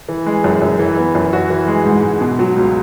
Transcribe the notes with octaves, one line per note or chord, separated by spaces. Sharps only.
E3
G#3
F#2
F#2
E3
B3
F#2
F#4
E3
G#3
G#2
G#2
B2
F#3
C#2